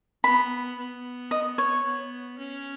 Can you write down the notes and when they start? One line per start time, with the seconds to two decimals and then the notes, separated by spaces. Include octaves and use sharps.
0.24 B3 B5
0.78 B3
1.31 D#5
1.58 C#5
1.85 B3
2.38 C#4